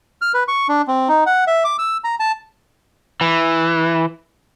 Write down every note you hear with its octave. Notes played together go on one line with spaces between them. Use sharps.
F6
B4
C#6
D4
C4
D#4
F#5
E5
D6
E6
A#5
A5
E3